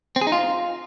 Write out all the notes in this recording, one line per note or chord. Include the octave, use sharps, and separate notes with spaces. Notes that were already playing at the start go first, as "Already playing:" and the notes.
C4
G#4
D#4
F4